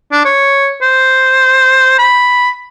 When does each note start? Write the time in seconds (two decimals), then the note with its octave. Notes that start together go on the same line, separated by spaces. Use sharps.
0.12 D4
0.25 C#5
0.82 C5
1.98 B5